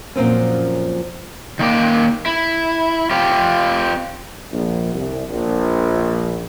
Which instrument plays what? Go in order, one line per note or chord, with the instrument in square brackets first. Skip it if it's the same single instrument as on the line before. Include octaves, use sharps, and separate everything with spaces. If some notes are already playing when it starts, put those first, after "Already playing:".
[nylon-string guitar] F#2 A#2 F3 C4 C#4
[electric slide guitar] D#3 A#3 D5
E4
C4 F4 G4
[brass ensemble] A#1
C2
A#1